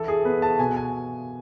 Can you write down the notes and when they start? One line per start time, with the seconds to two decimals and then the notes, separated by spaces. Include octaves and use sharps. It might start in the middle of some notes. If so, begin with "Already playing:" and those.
Already playing: E3 A4
0.08 G#4
0.25 B3 B4
0.42 A5
0.59 B2 G#5
0.77 G#5